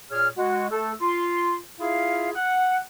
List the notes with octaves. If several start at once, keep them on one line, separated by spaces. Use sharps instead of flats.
A#2 G#4 C#5 F6
G#3 F#4
A3 A4
F4 C6
E4 F4 G#4 E5 F5
F#5